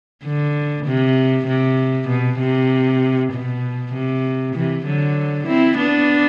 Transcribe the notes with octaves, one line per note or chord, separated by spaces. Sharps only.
D3
C3
C3
B2
C3
B2
C3
C3 E3
D3 F#3
C4 E4
B3 D4